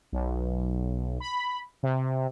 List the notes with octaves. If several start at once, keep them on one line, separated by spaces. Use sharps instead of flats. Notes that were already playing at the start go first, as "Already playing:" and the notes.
B1
B5
C3